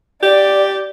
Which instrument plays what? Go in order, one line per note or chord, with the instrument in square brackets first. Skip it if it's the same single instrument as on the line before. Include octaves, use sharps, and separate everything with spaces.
[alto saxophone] G4 [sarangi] D5